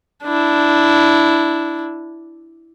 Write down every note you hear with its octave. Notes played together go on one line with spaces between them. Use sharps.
D4 E4